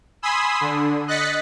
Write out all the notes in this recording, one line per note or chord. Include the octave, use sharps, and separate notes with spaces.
G#5 B5 C6 D#6 E6
D3
D#5 F#6 A6 B6 C#7